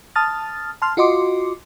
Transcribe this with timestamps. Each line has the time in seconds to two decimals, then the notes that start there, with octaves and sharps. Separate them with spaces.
0.16 A5 D#6 F6 A6
0.82 A5 C6 F6
0.97 F4 F#4 D#5 C6 D6